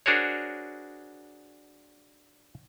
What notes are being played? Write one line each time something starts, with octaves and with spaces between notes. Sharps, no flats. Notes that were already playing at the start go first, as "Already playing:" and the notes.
D4 F#4 G#4 A#4 C5 C#5